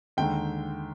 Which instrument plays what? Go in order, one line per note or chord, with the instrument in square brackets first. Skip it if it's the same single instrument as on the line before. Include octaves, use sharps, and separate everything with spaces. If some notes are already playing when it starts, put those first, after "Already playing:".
[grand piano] D#2 D3 G#3 D#4 G5